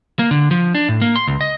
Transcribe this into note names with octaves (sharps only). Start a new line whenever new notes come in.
A#3
D3
F3
D4
A2
A#3
C6
C#2
D#5